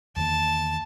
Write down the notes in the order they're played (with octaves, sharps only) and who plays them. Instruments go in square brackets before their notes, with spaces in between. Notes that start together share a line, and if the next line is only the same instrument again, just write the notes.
[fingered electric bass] E2 D#3 A#3 [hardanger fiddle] A5